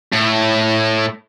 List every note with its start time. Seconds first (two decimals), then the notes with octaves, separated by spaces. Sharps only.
0.13 A2